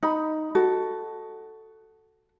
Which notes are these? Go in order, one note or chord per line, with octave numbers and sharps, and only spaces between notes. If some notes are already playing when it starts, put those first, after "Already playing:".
D#4 B5
F#4 A4